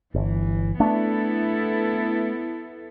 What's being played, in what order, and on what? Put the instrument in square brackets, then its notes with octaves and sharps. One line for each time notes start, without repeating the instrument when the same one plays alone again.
[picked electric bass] G1 [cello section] E3
[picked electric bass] A3 D4 [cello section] B3 E4 A4